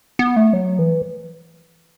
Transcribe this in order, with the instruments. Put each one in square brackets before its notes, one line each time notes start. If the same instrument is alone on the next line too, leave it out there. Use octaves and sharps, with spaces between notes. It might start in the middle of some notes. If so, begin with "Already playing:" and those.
[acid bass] B3
A3
F#3
E3